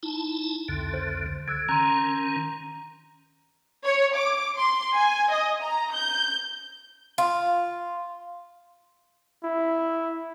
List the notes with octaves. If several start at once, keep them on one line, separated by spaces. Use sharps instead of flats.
D#4 E4 A5
C2 F2 D3
C5
D3 E6 G#6
D#3 C#4 A#5 C6
C#5
D6
C6
G#5
D#5
A#5
G6
F4
E4